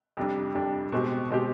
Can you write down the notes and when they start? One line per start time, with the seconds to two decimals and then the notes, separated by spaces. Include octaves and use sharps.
0.17 F2 C3 G3 D4
0.54 F2 C3 G3 D4
0.92 B2 G#3 C4 G4
1.30 B2 G#3 C4 G4